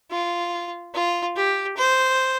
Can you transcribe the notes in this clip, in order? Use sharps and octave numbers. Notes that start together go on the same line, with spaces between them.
F4
F4
G4
C5